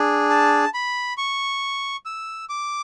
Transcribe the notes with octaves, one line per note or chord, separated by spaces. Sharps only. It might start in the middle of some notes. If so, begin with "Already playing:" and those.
Already playing: D4 G#4
A5
B5
C#6
E6
D6